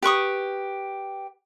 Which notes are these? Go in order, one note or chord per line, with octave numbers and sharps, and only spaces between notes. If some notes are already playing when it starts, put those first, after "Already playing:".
G4 B4 C#6 D#6